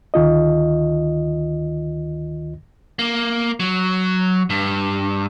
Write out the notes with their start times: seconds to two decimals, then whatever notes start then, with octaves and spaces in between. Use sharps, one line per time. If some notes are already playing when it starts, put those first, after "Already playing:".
0.14 D2 D#3 F4 D#5
2.99 A#3
3.60 F#3
4.50 G2